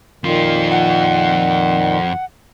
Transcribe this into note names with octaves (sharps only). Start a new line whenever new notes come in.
F2 A#2 D#3 F4
F#5